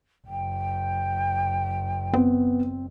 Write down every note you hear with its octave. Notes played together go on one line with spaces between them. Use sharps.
F#1 G5
B3 C4